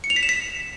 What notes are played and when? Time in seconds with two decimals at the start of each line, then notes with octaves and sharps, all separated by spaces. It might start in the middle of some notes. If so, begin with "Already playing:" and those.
0.04 C#7
0.10 F7
0.16 B6
0.23 E7
0.29 B6